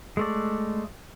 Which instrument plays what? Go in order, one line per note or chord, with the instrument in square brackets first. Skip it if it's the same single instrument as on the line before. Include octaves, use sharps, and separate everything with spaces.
[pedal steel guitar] G#3 A3 D5